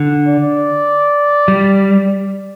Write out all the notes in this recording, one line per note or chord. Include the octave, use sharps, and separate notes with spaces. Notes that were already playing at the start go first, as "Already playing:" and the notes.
Already playing: D3
D5
G3